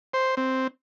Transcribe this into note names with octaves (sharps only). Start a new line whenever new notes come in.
C5
C4